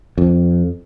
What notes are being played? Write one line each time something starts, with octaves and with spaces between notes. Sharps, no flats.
F2